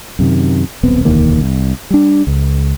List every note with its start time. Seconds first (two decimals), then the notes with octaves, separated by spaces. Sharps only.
0.19 F#2 C3 D#3
0.83 D#1 B1 B3 C4
1.05 E1 D2 D#3 A#3
1.41 C2
1.90 G3 D4
2.27 C#2